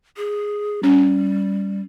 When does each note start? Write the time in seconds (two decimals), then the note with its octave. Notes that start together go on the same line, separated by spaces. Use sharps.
0.17 G#4
0.83 G3 C#4